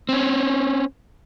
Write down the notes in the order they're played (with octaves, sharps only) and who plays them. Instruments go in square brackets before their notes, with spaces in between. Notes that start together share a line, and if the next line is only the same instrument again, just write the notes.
[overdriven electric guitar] C4 C#4